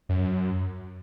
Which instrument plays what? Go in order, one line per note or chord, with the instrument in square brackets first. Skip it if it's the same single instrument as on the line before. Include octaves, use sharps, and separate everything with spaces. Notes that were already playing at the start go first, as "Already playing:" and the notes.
[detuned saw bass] F#2